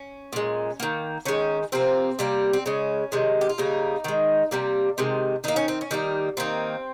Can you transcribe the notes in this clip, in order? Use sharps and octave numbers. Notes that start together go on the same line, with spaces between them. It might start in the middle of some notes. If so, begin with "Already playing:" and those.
Already playing: C#4
A#2 G#3
D#3 A#3
D#3 G#3 C#4
C3 F3 A#3 C4
C3 G3 A#3
C4
C#3 G#3 C#4
C3 D#3 G#3
G4
F4
C#3 G3 A#3 D#4
D#3 G#3
C3 G3 A#3
C3 D#3 G#3
D#3 A#3 D#4
C#4
C4
C#4
D#3 G3 A#3
D#3 A#3 C4